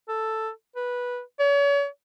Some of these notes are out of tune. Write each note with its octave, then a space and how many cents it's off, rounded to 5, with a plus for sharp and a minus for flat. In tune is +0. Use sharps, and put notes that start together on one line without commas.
A4 +5
B4 -10
C#5 +40